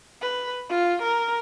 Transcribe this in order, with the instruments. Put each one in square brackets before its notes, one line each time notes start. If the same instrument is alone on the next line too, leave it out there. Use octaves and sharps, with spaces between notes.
[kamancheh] B4
F4
A#4